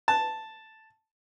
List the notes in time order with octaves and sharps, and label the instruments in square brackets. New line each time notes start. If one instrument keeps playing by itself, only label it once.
[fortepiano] A5